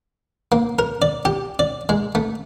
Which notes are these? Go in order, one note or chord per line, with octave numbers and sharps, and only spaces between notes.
A#3
A#4
D5
G4
D5
G#3
A3